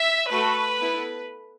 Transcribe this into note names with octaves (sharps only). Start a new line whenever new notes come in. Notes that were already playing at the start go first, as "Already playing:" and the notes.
Already playing: E5
A3 F#4 A4 B4
B3 E4 A4